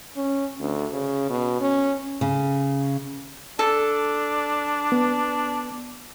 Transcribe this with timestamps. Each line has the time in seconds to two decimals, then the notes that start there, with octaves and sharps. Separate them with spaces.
0.16 C#4
0.60 D2
0.93 C#3
1.30 B2
1.60 C#4
2.21 C#3
3.59 D4 A4
4.92 B3